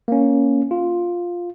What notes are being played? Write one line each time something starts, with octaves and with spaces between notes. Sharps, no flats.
A#3 C#4
F4